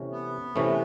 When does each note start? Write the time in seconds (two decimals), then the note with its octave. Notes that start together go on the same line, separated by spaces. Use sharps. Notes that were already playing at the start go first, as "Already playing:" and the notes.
Already playing: C3 E3 A3 C#4
0.12 B3
0.56 C3 E3 A3 C#4